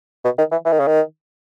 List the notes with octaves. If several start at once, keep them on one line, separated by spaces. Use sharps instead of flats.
B2
D#3
E3
E3
D#3
C#3
D#3